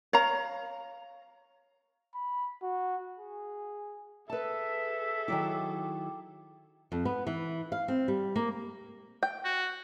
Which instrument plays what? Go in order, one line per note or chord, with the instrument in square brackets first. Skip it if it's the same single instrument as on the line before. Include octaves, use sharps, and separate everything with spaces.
[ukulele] C#5 F5 A#5
[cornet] B5
F#4
G#4
[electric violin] G#4 A4 [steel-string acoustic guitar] B4 A5 [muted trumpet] E5
[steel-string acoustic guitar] D#3 F#3 E4 [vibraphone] G5 D6
[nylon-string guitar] F2
B3
E3
F5
C4
G3
A#3
[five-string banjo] G5
[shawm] F#4